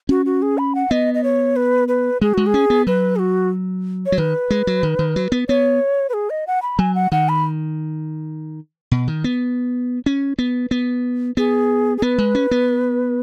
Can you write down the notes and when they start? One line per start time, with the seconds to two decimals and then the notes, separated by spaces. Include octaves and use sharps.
0.09 C#4 F#4
0.26 F#4
0.42 G#4
0.58 B5
0.75 F#5
0.91 B3 D#5
1.14 D#5
1.23 C#5
1.56 B4
1.88 B4
2.21 G#3 G#4
2.34 G#3 F#4
2.47 G#4
2.54 C#4
2.70 B3
2.87 F#3 B4
3.16 G#4
3.19 F#4
4.06 C#5
4.12 F#3
4.18 D#3 B4
4.50 G#3
4.67 F#3
4.83 D#3
4.99 D#3
5.16 F#3
5.32 B3
5.48 B3 C#5
6.09 B4
6.14 G#4
6.30 D#5
6.47 F#5
6.62 B5
6.79 F#3 G#5
6.95 F#5
7.12 D#3 F#5
7.29 B5
8.91 B2
9.08 D#3
9.24 B3
10.06 C#4
10.39 B3
10.71 B3
11.37 B3 G#4
11.98 G#4
12.02 B3 B4
12.18 G#3
12.35 C#4
12.51 B3